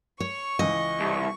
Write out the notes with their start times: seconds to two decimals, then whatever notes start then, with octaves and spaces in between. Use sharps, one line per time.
0.20 C#5 C#6
0.59 C#2 E3 D#5
1.00 C2